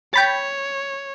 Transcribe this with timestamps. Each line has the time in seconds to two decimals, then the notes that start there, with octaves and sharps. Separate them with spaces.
0.14 C#5 G5 B5 A6